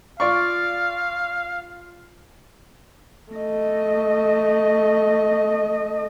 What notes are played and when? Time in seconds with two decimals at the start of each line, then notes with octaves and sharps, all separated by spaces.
0.20 F4 D5 F5 C#6
3.32 A3 D#5